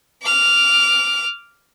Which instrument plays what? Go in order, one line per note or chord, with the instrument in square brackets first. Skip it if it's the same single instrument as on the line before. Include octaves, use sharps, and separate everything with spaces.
[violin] D6 F6